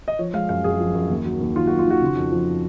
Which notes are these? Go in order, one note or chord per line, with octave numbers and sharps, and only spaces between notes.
D#5
F3 C#5
G#3 F5
F#2 F5
F#2 G#4
F3
F#2
D#2
F#3
D#2
D#3 F4
F#4
F#3
F4
D#3 F#4
C#3
F2
F3